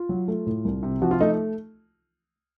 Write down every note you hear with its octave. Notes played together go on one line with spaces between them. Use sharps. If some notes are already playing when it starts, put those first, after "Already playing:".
Already playing: F4
F#3
A3
A2
C2
C3
F3 F#4
F4
A3 D#4